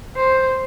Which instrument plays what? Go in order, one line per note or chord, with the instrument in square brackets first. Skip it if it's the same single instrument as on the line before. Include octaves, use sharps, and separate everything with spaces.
[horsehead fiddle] C5